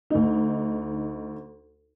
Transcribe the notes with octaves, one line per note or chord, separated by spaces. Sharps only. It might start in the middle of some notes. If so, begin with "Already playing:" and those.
D2 D#4